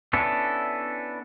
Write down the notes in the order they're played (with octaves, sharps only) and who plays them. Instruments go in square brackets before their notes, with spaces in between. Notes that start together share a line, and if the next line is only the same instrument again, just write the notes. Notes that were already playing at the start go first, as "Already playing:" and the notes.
[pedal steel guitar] B3 C#4 D4 E4 A4